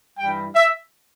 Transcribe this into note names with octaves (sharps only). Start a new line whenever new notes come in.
G2 E3 G3 G5
E5